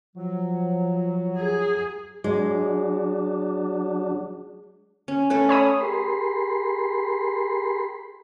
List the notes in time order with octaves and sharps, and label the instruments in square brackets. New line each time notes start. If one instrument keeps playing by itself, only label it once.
[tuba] F3 [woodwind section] F#3
[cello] G#4
[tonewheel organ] F#3 D4 [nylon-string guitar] G#3
[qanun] C#4
A3 C#4 B4
[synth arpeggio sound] C#5 B5 D#6
[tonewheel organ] G4 G#4 A#4 B5 C6